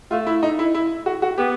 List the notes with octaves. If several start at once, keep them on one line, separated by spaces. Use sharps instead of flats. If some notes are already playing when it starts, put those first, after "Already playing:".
A3 F4
E4
D#4
E4
E4
F#4
F#4
B3 G4